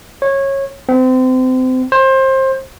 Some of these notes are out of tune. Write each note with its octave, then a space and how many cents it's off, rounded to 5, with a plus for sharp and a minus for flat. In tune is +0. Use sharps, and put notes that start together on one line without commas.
C#5 -20
C4 -30
C5 +25